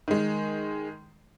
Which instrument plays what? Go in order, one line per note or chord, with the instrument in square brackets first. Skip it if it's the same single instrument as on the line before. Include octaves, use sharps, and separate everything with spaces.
[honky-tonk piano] D#3 G#3